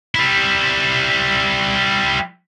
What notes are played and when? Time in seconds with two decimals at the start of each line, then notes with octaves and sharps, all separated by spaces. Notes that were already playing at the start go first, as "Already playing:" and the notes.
0.15 G3 E4